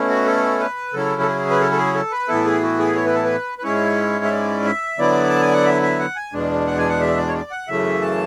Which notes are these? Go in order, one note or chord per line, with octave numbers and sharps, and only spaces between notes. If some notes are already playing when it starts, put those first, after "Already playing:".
Already playing: B2 A3 C#4 E4
F#4
A4
B4
C#3 F#3 C#4 E4 A4
A4
G#4
B4
A4
A4
G#4
A4
B4
A2 E3 B3 E4 A4
G#4
F#4
G#4
C#5
B4
A4
B4
B4
G#2 G#3 C#4 E4 C#5
E5
D5
E5
D3 F#3 B3 E4 D5
A5
G#5
F#5
E5
E5
F#5
G#5
E2 B2 G#3 D4
F#5
G#5
F#5
E5
D5
C#5
D5
F#5
F#2 C#3 E3 A3 E5
A5